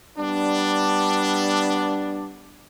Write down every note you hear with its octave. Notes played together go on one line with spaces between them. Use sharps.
G3 B3 D4